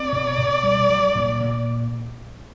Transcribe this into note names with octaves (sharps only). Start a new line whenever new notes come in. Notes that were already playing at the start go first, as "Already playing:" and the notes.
Already playing: C4 D5
B2
B2
G3
F#3
A#2
A#2